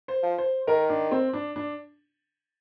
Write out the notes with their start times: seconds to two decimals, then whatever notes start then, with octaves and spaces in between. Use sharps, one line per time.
0.08 C5
0.23 F3
0.38 C5
0.67 D#3 A#4
0.89 D4
1.11 C4
1.33 D4
1.56 D4